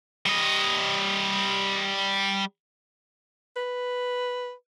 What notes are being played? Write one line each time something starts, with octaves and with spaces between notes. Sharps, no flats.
G3 D#5
B4